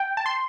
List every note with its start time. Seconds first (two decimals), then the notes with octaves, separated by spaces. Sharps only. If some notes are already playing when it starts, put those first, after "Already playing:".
Already playing: G5
0.17 A5
0.26 C6